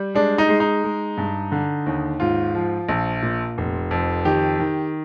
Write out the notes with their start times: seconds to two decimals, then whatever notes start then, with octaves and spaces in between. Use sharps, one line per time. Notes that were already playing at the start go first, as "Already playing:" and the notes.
Already playing: G3
0.15 G#3 D4
0.38 D#4
0.49 G#3
0.60 D#4
0.84 G#3
1.17 G2
1.52 D3
1.86 D#2
2.20 G#2 F4
2.55 F3
2.89 A#1
3.22 A#2
3.58 F1
3.91 F2
4.25 D#3 G4
4.59 D#3